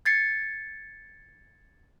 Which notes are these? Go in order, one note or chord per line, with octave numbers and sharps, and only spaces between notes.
G#6 A6 C7 C#7